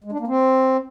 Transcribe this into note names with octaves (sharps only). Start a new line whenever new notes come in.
G#3
D4
A#3
C4